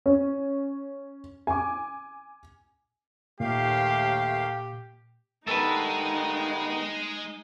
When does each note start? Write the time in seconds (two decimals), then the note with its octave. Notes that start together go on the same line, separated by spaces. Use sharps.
0.06 C#4
1.47 G#5 D6
3.40 D#2 A#2 A3 G4 F5
5.47 G2 D#3 G#3 B3 D#4 A4 B4